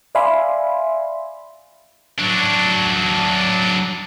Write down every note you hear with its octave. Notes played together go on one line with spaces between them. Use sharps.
D5 E5 F5 G#5 B5 C6
F#3 D4